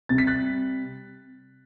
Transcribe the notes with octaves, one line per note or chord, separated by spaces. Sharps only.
C3 G3 A6
B6
F#6 A6